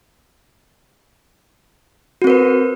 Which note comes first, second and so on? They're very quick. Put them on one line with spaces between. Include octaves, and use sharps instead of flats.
F#4 C4 A#4 B4